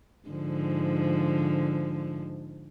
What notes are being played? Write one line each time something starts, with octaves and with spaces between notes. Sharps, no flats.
G#2 D3 F3